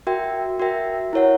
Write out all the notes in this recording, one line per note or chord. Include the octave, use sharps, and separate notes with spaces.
F#4 A#4 E5 G5
F#4 A#4 E5 G5
E4 A#4 C#5 F#5